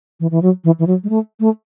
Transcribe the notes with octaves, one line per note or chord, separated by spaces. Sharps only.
E3
E3
F#3
E3
E3
F#3
G#3
A3
A3